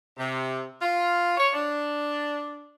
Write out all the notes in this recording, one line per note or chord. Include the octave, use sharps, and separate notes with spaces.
C3
F4
C#5
D4